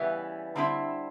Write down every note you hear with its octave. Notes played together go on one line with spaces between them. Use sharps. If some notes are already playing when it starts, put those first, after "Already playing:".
Already playing: C#3 E3 G3 B3 E4
D3 G3 C4 E4